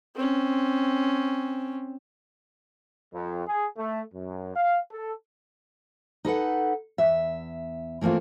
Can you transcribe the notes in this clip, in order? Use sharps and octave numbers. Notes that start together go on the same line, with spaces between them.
C4 C#4
F2
G#4
A3
F#2
F5
A4
D#4 A4 B4 F#5
E2 E5
E3 A3 A#3 C4 F4